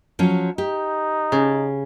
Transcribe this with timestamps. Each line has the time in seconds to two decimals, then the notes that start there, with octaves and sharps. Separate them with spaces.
0.19 F3 F#3 C#4
0.58 D#4 G4
1.32 C#3